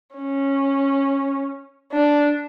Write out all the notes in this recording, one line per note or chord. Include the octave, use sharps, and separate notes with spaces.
C#4
D4